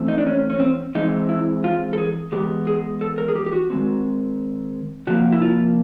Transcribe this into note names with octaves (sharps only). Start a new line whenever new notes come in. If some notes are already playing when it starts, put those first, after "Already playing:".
Already playing: E3 A3 C4
D#4
D4
C#4
C#4
C4
E3 G#3 C4 D#4
E4
F4
A4
G#4
E3 G#3 B3 G4
G#4
A4
A#4
G#4
G4
G4
F#4
D#3 G#3 C4
C3 F3 A#3 F#4
E4
F4